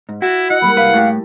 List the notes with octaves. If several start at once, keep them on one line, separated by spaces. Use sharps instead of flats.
G#2
E4 F#4
E4 D#5 F#5
G3 G#3 A#3 B5
C2 B4 F5
A2 G4 A5 A6 A#6